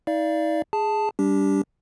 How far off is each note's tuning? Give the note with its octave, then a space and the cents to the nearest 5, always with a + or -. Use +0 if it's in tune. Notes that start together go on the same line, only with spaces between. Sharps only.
D#4 +40 D5 +0 F5 -30
G#4 +0 A5 +0
G3 +0 D4 -25 G4 +0